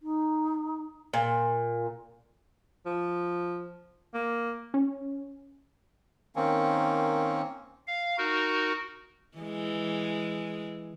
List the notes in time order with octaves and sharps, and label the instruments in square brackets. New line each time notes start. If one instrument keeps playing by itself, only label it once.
[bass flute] D#4
[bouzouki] A#2
[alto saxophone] F3
A#3
[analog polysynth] C#4
[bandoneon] D#3 A#3 C4 C#4
[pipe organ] F5
D#4 F#4 A#4
[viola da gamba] E3 G#3